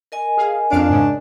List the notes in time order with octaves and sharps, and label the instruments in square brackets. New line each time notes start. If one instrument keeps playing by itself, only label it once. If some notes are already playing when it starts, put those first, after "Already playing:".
[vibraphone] A#4 D#5 G#5
[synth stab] G#4 F5
[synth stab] F2 F5 D7 [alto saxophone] D4
[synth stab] G#2 C#3